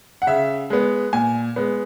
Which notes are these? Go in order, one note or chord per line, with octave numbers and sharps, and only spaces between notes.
F#5
C#3 E5
G#3 B3
A#2 G#5
G#3 B3